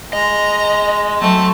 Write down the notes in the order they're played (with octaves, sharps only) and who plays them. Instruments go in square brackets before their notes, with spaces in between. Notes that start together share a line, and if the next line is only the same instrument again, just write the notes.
[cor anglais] G#3 [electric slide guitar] D#5 [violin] A#5
[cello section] F#3 [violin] A3 A5 [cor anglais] C4